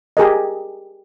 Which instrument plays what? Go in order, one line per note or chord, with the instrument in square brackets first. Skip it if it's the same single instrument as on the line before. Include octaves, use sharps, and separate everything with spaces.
[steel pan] G4 G#4 A#4 D#5